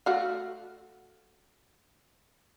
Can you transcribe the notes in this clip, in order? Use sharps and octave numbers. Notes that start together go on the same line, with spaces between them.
A3 F#4 F5